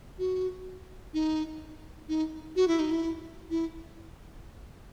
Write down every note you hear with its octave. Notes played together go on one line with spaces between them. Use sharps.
F#4
D#4
D#4
F#4
E4
D#4
E4
E4